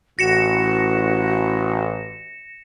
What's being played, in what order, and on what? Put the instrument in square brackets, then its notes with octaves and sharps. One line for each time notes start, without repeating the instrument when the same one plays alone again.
[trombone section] A1 [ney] F#4 [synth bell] A#6 C#7 E7